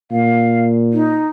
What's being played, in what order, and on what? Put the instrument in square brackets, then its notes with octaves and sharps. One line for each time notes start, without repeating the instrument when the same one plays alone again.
[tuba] A#2 [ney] F5
[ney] D#4